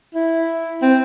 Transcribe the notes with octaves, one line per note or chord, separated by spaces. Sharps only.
E4
C4